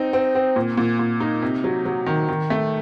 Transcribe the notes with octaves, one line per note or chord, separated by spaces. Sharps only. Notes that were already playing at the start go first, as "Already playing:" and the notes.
Already playing: C4 D#4
C4
C4
A#2
A#2
A#2
D#4
C3
F#3
F#3
D#3
D#3
A3